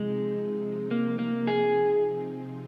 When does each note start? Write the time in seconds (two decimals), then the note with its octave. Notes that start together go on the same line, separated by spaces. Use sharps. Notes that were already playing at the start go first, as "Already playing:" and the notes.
Already playing: C3 F3 G#3 C4 D#4
0.91 A#3
1.19 A#3
1.47 G#4